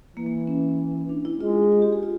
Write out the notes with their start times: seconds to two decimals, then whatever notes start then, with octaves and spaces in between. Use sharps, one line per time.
0.16 E3 A#3
0.26 A#3
0.47 C#4
1.09 D4
1.25 E4
1.41 G#3 F4
1.72 F4
1.82 G4
1.93 G#4
2.03 F4